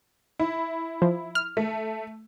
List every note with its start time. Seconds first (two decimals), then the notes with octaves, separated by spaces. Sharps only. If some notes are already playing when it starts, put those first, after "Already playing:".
0.39 E4
1.02 F3
1.35 F6
1.57 A3